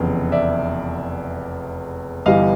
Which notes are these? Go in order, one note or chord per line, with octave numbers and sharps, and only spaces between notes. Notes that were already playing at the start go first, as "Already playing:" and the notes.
Already playing: F1 E2 C#3
D5 E5
G1 G2 E3 G3 D#5 F5